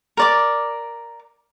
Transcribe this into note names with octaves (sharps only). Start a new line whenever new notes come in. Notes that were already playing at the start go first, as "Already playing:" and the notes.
A#4 D5 D6